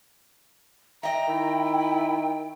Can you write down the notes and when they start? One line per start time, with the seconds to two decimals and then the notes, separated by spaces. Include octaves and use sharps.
1.03 D#5 E5 G5 A#5
1.28 D#3 E4